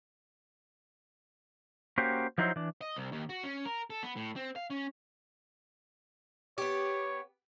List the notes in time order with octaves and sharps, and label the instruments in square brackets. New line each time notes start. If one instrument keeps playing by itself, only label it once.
[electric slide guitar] A#3 C#4 F#4 G4 C5
F3 F#3 D#4 E4 C5
E3 D4
[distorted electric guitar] D#5
C2
D#2
F#4
C#4
A#4
A4
B3
A2
C4
F5
C#4
[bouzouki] B3 G4 [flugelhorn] C#5